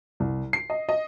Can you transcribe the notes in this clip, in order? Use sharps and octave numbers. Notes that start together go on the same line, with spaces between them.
C2
C7
D#5
D#5